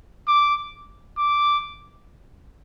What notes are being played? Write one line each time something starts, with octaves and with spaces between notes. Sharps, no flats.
D6
D6